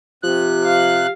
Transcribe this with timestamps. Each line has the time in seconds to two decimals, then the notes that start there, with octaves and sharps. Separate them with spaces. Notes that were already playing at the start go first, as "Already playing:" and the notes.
0.23 C3 F3 G4 F#6
0.64 F5